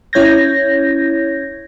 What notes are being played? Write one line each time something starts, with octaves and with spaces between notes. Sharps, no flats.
C#4 E4 C#5 G6 G#6 A#6